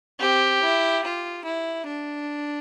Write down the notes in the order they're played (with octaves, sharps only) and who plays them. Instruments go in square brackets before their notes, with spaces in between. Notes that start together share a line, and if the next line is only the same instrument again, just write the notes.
[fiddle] C4 [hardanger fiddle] G4
[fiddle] E4
F4
E4
D4